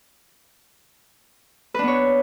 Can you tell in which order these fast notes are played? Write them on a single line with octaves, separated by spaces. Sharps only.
B4 D4 B3 C#5